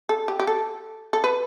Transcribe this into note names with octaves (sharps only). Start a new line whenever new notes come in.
A4
G4
G4
A4
A4
B4